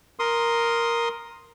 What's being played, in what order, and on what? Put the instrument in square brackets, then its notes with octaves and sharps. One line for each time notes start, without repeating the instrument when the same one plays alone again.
[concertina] A#4 C6 D#6